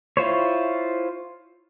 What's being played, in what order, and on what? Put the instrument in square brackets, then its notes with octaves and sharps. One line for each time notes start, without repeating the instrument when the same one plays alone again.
[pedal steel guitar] E4 F4 C5 C#5